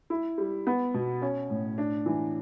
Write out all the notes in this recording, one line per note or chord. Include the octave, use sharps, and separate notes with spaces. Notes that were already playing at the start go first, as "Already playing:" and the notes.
E4
G3
B3
B2
C#4
A2
D4
E3